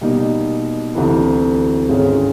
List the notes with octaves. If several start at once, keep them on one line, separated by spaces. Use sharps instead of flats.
B2 G3 A#3 D#4
D2 C3 E3
G#1 G#2 D#3 G#3 C#4